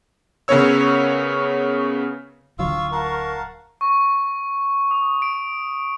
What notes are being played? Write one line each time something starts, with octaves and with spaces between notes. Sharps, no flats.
C#3 B3 C#4 A#4 C#5 E6
D1 D3 F#3 F4 F5 C#6 E6
A#4 F5 F#5 A5
C#6
D#6
D7